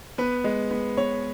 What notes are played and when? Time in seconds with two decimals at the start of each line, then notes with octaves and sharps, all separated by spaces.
0.18 B3 B4
0.44 G#3
0.71 B3
0.97 B3 C#5